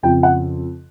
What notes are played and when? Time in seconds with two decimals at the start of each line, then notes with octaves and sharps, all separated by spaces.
0.03 F2 C#3 F3 G5
0.23 F#5